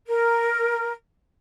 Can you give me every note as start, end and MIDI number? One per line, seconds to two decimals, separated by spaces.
0.08 0.92 70